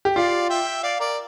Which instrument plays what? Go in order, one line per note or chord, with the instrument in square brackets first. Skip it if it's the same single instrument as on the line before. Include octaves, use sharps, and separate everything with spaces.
[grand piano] G4
[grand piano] F4 [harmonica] D5 F5
[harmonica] E5 G5
D5 F5
A#4 D5